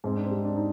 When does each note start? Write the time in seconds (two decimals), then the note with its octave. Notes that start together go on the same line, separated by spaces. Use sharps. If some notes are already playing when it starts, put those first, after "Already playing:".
0.04 G#2 C4
0.17 D4
0.24 C4
0.31 G3
0.45 D4
0.56 D#4